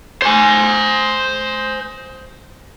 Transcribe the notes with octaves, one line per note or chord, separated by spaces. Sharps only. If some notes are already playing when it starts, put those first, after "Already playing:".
C5 G#5